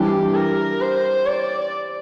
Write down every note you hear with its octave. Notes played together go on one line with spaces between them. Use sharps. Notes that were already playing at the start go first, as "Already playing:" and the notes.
Already playing: E3 G3 D4 G4
A#4
C5
D5